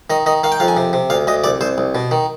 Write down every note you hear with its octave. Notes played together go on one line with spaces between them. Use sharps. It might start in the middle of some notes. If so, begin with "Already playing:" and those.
D#3 D#5
D#3 D#5
D#3 F5
G5
F2 F5
G#5
C3
C3
D2 F5
D2 D#5
C2 D5
C2 C5
C2
B2
D#3